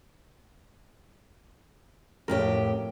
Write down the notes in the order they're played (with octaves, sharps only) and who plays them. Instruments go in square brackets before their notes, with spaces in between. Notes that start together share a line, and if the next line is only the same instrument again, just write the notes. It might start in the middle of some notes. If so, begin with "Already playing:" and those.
[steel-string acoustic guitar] F2 A2 G4 [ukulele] A#4 C#5